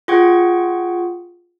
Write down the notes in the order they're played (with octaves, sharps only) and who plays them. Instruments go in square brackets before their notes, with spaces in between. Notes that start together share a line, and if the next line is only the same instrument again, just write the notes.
[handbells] F4 G#4 F#5 G5 C#6 G#6